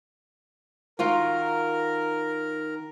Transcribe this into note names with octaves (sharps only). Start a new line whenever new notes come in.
D#3 F4 F#4 A#4